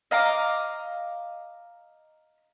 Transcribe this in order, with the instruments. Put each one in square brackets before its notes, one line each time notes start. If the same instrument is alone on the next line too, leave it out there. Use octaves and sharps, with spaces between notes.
[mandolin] D#5 F5 A#5 D6